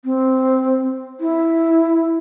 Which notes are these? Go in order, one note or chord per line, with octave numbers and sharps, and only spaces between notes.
C4
E4